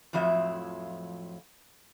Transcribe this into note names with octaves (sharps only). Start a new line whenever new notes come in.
F2 A2 F3 F#3 E5